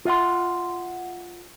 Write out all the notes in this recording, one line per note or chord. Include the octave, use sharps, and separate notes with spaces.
F4 E5 F#5 C6